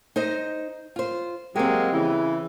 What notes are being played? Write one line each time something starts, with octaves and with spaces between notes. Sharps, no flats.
D#4 C5 D#5
F4 C5
F#3 G#3 A#3 C4 G4
C#3 E3